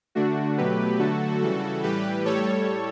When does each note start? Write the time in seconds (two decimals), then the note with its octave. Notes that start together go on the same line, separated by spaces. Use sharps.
0.15 D3 A3 D4 F#4
0.57 B2 F#3 A3 G4 B4
0.99 D3 F#3 A3 F#4 A4
1.41 C#3 E3 G3 F#4 A4
1.83 A2 E3 G3 G4 B4
2.25 A2 G3 A4 C#5